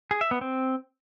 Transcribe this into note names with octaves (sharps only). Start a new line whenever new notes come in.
G#4
E5
B3
C4